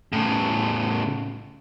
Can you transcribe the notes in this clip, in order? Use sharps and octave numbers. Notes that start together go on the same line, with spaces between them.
A2 C#3